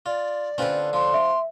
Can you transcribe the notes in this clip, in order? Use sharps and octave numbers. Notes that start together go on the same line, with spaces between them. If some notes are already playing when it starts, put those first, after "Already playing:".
F4 D5
D3 C4 C#4 F4 B4
F3 C6
E5